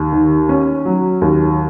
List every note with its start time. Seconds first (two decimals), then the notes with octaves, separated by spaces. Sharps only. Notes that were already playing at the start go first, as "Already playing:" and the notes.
Already playing: D#2
0.13 D#3
0.49 C#4
0.85 F#3
1.21 D#2